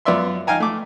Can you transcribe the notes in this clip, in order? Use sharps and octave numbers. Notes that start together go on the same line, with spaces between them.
F#2 B3 F4 D5 E5 C6
D#4 F5 G5 G#5 A#5
A3 D6